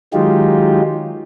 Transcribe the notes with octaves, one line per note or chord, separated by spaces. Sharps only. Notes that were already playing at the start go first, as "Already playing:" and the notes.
D#3 F#3 G#3 D#4 F4 G4